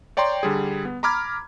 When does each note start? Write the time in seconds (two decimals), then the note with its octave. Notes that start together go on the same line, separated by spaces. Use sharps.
0.17 C#5 D5 G5 A#5 C6
0.43 D3 G3 G#4
0.85 B3
1.03 A#5 B5 D6 F6 G#6